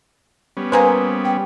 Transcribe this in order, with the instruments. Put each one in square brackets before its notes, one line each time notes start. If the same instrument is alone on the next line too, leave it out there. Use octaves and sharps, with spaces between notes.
[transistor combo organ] G3 B3 C#4
[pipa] A#3 G#4 C5 [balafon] B4 A#5
[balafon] G5